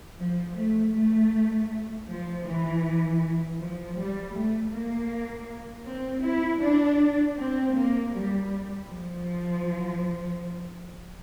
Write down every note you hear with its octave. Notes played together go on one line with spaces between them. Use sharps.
F3
A3
A3
F3
E3
F3
G3
A3
A#3
C4
E4
D4
C4
A#3
G3
F3